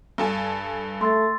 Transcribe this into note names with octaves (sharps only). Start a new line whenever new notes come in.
G2 A4 G#5
A3 C6 E6 A6